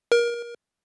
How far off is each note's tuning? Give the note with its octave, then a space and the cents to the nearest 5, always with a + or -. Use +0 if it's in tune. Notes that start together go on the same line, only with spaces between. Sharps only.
A#4 +25